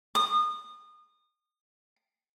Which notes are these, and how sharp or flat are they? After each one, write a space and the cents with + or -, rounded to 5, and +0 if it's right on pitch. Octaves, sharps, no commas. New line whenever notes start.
D#6 -30